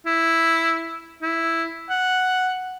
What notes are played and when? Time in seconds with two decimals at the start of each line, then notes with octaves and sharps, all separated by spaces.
0.06 E4
1.22 E4
1.90 F#5